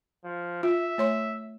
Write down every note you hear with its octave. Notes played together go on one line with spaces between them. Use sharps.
F3
F4 E5
A3 C#5 C6